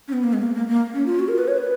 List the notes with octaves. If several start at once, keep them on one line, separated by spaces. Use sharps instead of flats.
C#4
B3
A#3
G#3
A#3
A#3
A#3
C#4
F4
F#4
A#4
B4
C#5
B4